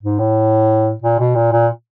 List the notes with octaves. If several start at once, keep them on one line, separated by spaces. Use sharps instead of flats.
G#2
A2
A#2
B2
A#2
A#2